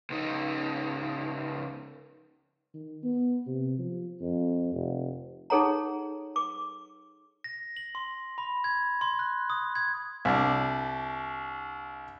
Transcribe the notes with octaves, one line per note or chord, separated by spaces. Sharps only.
C#2 D#4
D#3
B3
C3
F3
F2
F1
D#4 G#4 A4 C#5 F#5 A#5
D6
A#6
F#7
C6
B5
G#6
C6
F#6
D#6
G#6
C2 D4